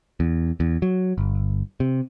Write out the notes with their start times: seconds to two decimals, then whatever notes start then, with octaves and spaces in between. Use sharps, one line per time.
0.20 E2
0.60 E2
0.82 F#3
1.18 G1
1.80 C3